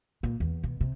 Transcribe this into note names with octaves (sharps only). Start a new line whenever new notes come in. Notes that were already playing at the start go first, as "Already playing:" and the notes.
A#2
E2
B2
C3